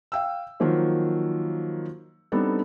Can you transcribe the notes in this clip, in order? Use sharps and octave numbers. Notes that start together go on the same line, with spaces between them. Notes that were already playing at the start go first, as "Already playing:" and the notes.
F5 G5 E6
D#3 F3 F#3 A#3 C5
G3 B3 C4 D4 D#4 A4